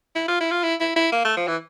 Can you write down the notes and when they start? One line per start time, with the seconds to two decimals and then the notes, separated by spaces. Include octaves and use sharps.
0.16 E4
0.28 F4
0.40 E4
0.51 F4
0.63 E4
0.80 E4
0.96 E4
1.12 A#3
1.25 A3
1.37 F3
1.48 E3